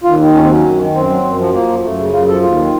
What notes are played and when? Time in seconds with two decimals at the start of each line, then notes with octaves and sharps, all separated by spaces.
0.04 D#2 F4
0.20 D#3
0.34 D#2 C#4
0.42 C4
0.49 F#3 C#4
0.64 F#2
0.79 D#3
0.95 F#2 C4
1.09 F#3
1.24 F#2
1.39 F3
1.54 F3 A#3
1.69 F#2
1.84 F#2 A3
1.98 C#3
2.13 F#2 F4
2.28 F3 A4
2.43 D#2 F4
2.58 D#3